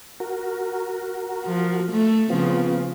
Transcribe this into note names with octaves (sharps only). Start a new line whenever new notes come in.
F#4 A#4
F3
A3
C#3 F3 B3 C4 F4